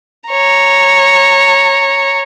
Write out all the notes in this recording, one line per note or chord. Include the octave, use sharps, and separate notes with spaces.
C#5 A#5